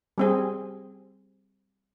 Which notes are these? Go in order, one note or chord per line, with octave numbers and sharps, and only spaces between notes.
G3 C4 G#4